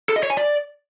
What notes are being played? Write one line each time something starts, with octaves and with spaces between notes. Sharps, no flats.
A4
D#5
C#5
G#5
D5